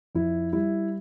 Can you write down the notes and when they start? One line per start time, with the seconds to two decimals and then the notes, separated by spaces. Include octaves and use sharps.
0.15 F2 E4
0.53 G3 E4